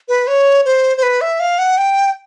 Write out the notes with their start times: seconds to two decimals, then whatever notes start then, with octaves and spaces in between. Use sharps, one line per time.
0.08 B4
0.27 C#5
0.65 C5
0.97 C5
1.03 B4
1.21 E5
1.40 F5
1.58 F#5
1.78 G5